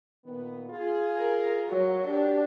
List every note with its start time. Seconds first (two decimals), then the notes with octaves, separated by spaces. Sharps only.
0.25 A#2 D#3 B3
0.69 F4 G#4
1.17 A#4
1.69 F#3
2.07 D4 G4